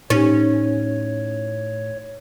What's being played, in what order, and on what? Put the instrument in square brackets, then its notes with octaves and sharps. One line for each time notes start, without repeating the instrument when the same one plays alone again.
[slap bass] A2 [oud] C#4 [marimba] D#4 G4 [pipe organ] C#5